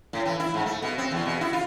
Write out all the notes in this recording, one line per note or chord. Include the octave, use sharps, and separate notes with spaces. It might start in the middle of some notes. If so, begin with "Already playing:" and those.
A2
E3
E4
G#2
A3
B2
C4
E2
B2
E4
F4